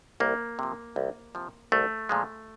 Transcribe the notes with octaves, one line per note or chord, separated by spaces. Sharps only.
C2 A#3
C3 F3
C2
C3 F3
C2 A3
A#2 F3 G#3